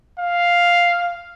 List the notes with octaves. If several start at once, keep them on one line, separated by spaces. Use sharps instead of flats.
F5